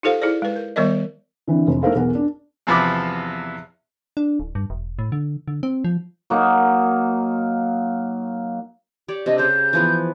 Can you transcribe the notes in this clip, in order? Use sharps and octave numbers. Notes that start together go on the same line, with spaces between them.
D#4 F4 G4 A4 C5 F5
E4 G#4 C5 D5
G#3 B4
A#4
D#3 G3 B3 A#4 D5 D#5
D3 E3 C4
F1
A3 D#4 A4 A#4 C5 F5
B1 E2 A#4 F#5
D4
E2 C3 F3 B3 B5 D6
D4
D1
G2
E1
A2
D3
D3
C4
F3
F#3 A#3 D#4
G4 C#5 D5
C3 C4 D4 D#5
C#3 C5 G6
E3 F3 B3